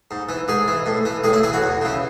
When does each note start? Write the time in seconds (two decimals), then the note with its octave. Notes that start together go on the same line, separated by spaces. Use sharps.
0.11 G#2
0.29 E3
0.48 G#2 G#4
0.68 E3
0.86 A2
1.05 E3
1.24 A2 G#4
1.33 E4
1.43 E3 G#4
1.53 F#4
1.63 E2
1.82 C#3 E3